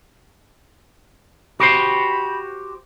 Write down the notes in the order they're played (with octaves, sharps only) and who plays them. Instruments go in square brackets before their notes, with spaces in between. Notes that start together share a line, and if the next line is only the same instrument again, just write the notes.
[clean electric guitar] F#4 G4 C5 [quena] B5